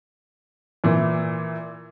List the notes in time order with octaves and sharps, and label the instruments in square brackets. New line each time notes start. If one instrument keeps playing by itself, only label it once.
[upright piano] A#2 E3